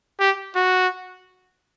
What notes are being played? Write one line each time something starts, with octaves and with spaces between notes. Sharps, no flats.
G4
F#4